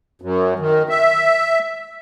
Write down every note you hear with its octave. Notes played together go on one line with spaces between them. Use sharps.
F#2
D#3
E5